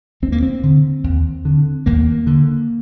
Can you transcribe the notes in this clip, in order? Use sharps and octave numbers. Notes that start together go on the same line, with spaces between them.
D#2 C4
A#3
C4
D3
D#2
D3
D#2 A#3
D3